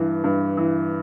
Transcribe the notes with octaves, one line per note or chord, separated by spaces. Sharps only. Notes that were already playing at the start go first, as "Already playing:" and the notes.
Already playing: G2 E3
G2
E3